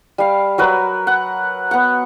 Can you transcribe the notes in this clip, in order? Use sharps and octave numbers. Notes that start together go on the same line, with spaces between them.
G3 F5
F#3 A#4 B4
F#5
B3 F#5